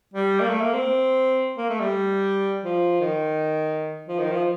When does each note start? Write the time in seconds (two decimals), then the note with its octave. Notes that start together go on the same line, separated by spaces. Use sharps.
0.14 G3
0.41 A#3
0.50 A3
0.61 A#3
0.74 C4
1.57 A#3
1.70 A3
1.81 G3
2.64 F3
3.01 D#3
4.08 F3
4.19 D#3
4.32 F3